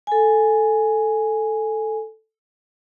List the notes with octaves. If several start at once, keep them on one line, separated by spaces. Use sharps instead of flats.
A4 G#5